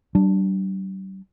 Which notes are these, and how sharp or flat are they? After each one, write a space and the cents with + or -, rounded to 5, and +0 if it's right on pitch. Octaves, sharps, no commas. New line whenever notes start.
G3 -40 D4 +0